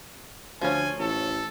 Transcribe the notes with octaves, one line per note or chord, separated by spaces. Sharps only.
D2 F3 C#4 G#5
A1 A4